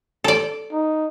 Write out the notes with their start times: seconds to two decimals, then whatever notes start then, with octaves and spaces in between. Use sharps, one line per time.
0.24 A4 D5
0.72 D#4